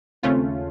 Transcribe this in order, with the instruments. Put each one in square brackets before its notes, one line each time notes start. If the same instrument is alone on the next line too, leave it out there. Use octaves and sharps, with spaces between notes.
[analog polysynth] D#2 C#3 A3 C#4 F4 [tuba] C4